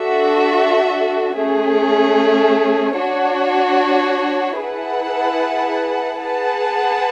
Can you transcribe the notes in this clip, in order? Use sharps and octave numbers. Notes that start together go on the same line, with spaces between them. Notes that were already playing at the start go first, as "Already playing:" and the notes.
Already playing: D4 F#4 A4 E5
A3 C#4 G#4
D4 F#4 C#5
E4 G#4 B4 F#5 A5
G#4 B4 F#5 A5